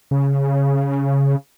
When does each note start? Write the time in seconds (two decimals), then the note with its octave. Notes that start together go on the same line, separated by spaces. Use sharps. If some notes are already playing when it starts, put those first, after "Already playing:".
0.11 C#3